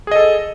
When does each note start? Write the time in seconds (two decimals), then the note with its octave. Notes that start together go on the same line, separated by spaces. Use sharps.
0.07 G#4
0.11 D#5
0.16 A4